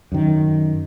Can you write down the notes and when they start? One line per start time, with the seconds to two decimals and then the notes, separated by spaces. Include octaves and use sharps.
0.12 F#2 D#3